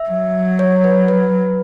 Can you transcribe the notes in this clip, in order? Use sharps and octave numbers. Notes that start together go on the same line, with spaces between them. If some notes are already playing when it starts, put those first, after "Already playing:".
Already playing: E5
F#3
C#5
B4
B4